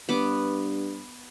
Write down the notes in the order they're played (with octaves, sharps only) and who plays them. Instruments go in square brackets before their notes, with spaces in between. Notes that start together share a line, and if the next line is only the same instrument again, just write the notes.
[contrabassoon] G2 [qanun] B3 D6